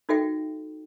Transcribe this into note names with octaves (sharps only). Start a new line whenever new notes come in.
D#4 F#4 A4 E5 G5